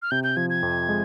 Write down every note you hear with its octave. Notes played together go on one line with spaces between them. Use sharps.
F6
C3 G6
G6
F3 G#6
G#6
F2
G#3